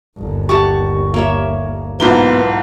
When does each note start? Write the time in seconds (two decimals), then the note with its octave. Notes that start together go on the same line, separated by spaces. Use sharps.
0.17 G1 D#2
0.49 G4 F#5 A5 C#6
1.14 A#3 C#5 E5
2.00 B1 G#2 A#3 B3 E4 F4 G7